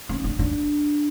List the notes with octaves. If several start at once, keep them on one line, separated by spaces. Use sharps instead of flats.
C#4
D4
D4